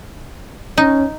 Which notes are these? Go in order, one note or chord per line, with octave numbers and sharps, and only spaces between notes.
C#4 D#4